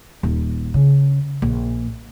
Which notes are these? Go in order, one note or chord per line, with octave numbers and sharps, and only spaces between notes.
D#1
C#3
A#1